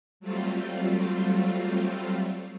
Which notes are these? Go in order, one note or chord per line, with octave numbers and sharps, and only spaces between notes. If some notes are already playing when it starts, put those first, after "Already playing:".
F#3 G3 A3 C4 F4